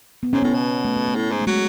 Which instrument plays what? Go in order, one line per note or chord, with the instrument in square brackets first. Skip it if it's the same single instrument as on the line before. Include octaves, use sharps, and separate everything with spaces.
[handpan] B3
[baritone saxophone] G#2 [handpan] C#4
[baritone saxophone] A2 [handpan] B3
[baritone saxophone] B2
[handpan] A3
B3
A3
[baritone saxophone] A2
G#2
[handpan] A3
[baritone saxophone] F#3 [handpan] G#3